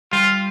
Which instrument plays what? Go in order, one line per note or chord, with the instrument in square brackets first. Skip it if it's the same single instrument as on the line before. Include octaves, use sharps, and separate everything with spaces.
[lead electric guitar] G3 [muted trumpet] F4